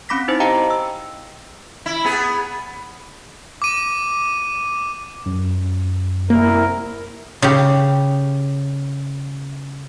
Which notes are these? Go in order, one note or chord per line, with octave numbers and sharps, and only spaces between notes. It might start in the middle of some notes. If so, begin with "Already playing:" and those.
C4 C#4 B5 D6 A#6 B6
D#4 E4 C5
G4 D#5 F5 G5 A5 A#5
E6
E4
B3 G#4
D6 D#7
F#2
C2 A#3 E4 A#4
C#3 G4